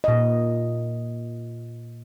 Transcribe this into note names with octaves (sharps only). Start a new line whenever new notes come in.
A#2 D#5